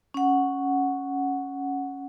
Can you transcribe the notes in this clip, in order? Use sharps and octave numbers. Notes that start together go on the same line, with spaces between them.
C#4 F#5